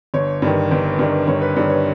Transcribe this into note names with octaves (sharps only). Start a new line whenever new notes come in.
G1 C#5
G2 D#3
G1
G2 D#3
G1 C#5
B4
G2 D#3 C#5
C#5